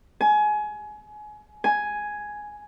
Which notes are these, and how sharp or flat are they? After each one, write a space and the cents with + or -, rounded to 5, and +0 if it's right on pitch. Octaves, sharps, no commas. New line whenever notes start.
G#5 +25
G#5 +5